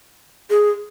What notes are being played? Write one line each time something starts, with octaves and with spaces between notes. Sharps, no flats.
G#4